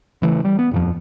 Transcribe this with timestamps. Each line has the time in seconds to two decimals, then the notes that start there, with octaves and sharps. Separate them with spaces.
0.22 C#3 E3 A3
0.45 G3
0.59 B3
0.71 D#1 F2 F3